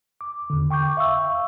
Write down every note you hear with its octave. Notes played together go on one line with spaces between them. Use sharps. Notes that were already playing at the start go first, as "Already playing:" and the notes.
D6
E2 D3
G5 C#6 D6 G6
E5 F5 C#6 E6